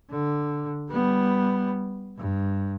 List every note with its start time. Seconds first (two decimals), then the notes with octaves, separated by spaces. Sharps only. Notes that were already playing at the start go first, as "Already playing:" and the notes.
0.11 D3
0.90 G3 B3
2.18 G2